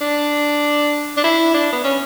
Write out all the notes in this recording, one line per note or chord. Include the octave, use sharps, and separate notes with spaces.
D4
D4
E4
D4
B3
C#4